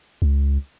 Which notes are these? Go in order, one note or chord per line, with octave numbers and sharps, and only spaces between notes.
C#2